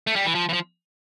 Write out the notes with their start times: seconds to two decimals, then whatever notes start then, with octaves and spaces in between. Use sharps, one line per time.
0.07 A3
0.16 G3
0.26 E3
0.35 F3
0.49 E3
0.53 F3